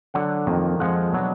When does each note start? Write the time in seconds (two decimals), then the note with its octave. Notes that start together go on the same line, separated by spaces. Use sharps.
0.14 D3 F#3 D4 F#5
0.47 F2 D#3 A#3
0.79 F2 F3 G#3 F#5
1.13 B2 F#3 D4